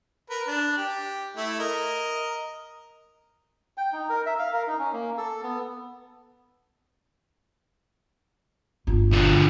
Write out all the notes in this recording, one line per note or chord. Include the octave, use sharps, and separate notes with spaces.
A#4 B4
D4
G4
A3 E4
A#4 D#5
G5
D#4
A#4
E5
F5
A#4
D#4
C#4
A#3
A4
B3
G1 F4
D3 F3